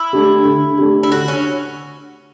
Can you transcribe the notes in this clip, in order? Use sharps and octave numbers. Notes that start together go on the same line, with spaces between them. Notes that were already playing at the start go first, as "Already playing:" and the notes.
Already playing: E4
A3 D4 G4
D3
A3 D4 G4
E4
D3 F#4
C#4